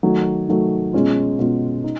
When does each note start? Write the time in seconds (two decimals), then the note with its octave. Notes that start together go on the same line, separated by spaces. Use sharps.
0.03 D#3 F#3 A3
0.49 D#3 F#3 A3
0.93 B2 G#3 C#4 F4
1.39 B2 G#3 C#4 F4
1.84 D#4